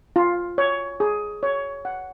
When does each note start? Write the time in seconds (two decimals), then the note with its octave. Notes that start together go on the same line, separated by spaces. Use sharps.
0.16 F4
0.58 C#5
1.00 G#4
1.43 C#5
1.85 F#5